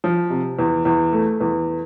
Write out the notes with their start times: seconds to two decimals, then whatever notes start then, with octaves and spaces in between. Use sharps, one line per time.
0.04 F3
0.30 C3
0.59 E2
0.85 E2
1.13 A3
1.41 E2